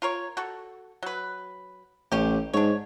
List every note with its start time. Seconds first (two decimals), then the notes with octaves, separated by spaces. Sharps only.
0.02 F4 A#4 C#5
0.37 F#4 A4
1.03 F#3 B4
2.12 A1 C#4 G4
2.53 G#2 D4 C#5